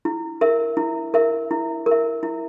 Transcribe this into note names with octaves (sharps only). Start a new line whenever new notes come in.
E4
A#4 E5
E4
A#4 E5
E4
A#4
E5
E4